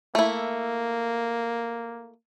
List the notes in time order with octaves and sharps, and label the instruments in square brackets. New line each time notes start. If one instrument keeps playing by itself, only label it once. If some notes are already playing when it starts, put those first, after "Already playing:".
[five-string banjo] A3 E4 [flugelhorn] A#3